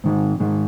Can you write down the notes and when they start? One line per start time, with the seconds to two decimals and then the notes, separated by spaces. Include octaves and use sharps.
0.04 G#2 D#3 G#3
0.40 G#2 D#3 G#3